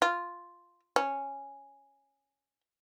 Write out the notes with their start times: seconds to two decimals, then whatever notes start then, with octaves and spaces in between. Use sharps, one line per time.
0.02 F4
0.96 C#4